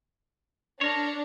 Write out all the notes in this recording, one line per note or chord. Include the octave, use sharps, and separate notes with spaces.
D4 A#4 C#5